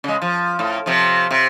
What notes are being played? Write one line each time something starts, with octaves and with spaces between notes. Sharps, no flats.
C#3 G#3
F3
A2
C3 F3
C3